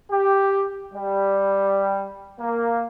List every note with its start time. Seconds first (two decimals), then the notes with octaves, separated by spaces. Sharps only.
0.11 G4
0.94 G3
2.40 A#3